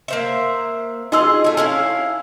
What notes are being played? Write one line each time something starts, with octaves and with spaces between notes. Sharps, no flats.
A#3 C5 E5
D#4 F4 F#4 G#4 D#5 E6
A3 G#5
C#4 E4 F5